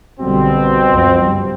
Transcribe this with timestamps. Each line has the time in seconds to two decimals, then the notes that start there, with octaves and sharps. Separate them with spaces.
0.20 B1 B2 D3 G3 C4
0.89 C#2 F#2 F3
1.23 G2 G3